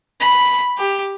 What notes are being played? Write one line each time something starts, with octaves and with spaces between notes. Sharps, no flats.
B5
G4